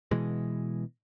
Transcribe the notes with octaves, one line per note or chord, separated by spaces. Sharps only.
B2 E3 G#3